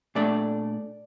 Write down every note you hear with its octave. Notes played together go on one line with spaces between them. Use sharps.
A#2 A3 D4 D5